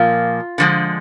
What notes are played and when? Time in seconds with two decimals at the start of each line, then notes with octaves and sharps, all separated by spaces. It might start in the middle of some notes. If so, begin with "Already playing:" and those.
Already playing: A#2 F3 A#3 F4
0.58 D3 F3 G#3